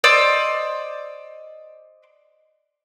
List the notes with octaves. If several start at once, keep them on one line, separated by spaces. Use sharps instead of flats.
C5 D5 D#5 E6